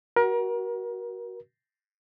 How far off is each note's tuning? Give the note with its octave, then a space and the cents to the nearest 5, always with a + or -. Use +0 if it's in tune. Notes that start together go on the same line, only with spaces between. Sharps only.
F#4 +20 A#4 +30